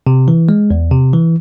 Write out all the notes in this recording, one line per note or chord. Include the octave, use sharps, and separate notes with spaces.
C3
E3
G#3
E2
C3
E3